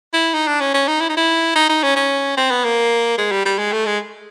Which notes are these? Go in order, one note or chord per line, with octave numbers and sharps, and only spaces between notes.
E4
D#4
D4
C#4
C#4
D#4
E4
D#4
E4
D#4
D#4
C#4
C#4
C4
B3
A#3
G#3
G3
G3
G#3
A3
G#3